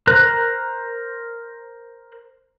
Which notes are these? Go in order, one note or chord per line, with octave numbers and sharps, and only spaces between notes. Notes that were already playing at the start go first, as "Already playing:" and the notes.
A#4 C5 F#6